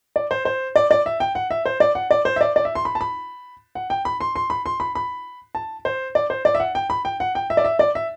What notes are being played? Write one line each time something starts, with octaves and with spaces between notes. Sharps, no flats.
D5
C5
C5
D5
D5
E5
G5
F#5
E5
C5
D5
F#5
D5
C5
E5
D5
D5
E5
C6
B5
A5
B5
F#5
G5
B5
C6
C6
B5
C6
B5
B5
A5
C5
D5
C5
D5
E5
F#5
G5
B5
G5
F#5
G5
E5
D5
E5
D5
E5